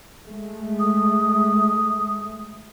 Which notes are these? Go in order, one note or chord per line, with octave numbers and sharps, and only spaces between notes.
G#3 A3
D#6